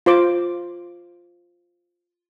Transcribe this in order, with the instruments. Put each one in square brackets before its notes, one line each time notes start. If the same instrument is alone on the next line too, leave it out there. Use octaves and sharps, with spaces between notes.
[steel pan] F4 C5 D6